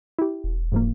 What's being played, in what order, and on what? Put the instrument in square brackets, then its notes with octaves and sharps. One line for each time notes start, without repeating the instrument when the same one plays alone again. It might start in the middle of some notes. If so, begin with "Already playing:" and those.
[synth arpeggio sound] E4 G4
[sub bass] E1
[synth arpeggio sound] G#2 F3 A#3